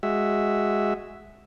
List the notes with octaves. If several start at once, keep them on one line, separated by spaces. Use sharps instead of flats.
G#3 F#4 E5